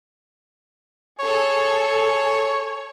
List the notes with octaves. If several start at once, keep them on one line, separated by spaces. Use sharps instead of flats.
G#4 A4 C#5